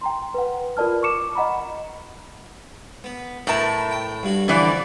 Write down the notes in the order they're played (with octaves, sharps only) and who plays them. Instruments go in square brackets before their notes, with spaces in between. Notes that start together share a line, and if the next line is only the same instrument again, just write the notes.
[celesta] G5 A#5 C6
B4 F#5
F4 A#4 D5 A5 F6
C#6 D6 C#7 E7
D#5 F#5 A#5 B5
[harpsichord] B3
[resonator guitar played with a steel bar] A2 A5 [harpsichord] A#4 B4 E5
[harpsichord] G5
G2 F#4
[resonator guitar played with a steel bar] D3 E3 D5 [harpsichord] F3 F#4